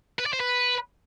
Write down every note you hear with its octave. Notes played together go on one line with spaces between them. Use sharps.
B4
D5
C5
B4